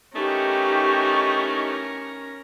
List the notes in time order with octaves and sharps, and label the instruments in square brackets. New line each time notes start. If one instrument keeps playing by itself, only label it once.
[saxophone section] E3 A3 D#4 [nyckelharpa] C#4 A#4 [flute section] G4 C#6